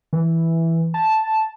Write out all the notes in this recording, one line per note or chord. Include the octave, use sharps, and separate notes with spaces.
E3
A5